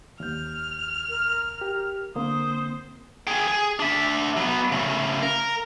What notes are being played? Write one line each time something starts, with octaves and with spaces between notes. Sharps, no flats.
D#2 F6 G6
A#4
G4
D3 A#3 C4 C5 D#6
G#4 G5
G#4
D4 E5
F#3 B3
C#3 A3
A#4